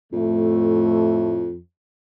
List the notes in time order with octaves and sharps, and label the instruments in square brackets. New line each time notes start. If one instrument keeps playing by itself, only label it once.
[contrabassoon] F2 [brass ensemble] A2 A3